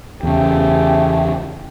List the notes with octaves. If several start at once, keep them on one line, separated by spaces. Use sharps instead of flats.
E2 C#3 A3 G4 G#4